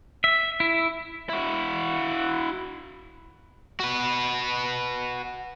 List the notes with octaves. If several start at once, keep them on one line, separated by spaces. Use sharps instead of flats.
E5
E4
E4 F#4
F#4 B4